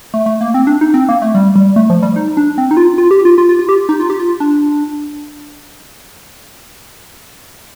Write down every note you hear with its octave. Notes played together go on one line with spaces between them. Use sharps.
A3
A3
A#3
C4
D4
D#4
C4
A#3
A3
G3
G3
A3
F3
G3
D#4
D4
C4
D#4
F4
F4
G4
F4
F4
F4
F4
G4
D#4
F4
G4
F4
D4